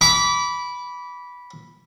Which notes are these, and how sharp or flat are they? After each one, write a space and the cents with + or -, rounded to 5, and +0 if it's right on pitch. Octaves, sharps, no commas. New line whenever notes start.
B5 -10 D6 -30